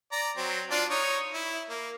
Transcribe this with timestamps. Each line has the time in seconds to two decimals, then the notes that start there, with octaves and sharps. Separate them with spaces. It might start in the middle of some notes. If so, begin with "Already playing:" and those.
0.12 D5 A#5
0.37 F#3 C4
0.71 D4 F4 D5
0.90 D#4 C#5
1.34 E4
1.70 A#3